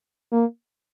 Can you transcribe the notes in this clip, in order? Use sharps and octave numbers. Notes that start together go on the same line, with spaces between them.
A#3